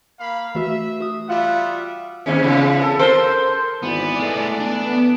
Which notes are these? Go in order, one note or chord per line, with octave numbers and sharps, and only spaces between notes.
A#3 F5 B5
E3 A3 F#4 E5
F#4 D#6
G3 F4 E5 F#5
D#2 G#2 C#4
E2 C#3
A4
A4 A#4 C5
G#1 E3 B3 D5
G#3 A3 B3
B3 D4